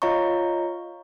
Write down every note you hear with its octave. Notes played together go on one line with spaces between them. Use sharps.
F4 C#5 D#5 F5 A#5 C#6